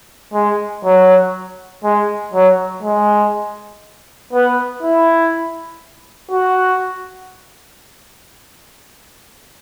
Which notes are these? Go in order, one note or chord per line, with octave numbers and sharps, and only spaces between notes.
G#3
F#3
G#3
F#3
G#3
B3
E4
F#4